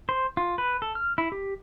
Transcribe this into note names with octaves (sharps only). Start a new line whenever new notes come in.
C5
F4
B4
A4
F6
E4
G4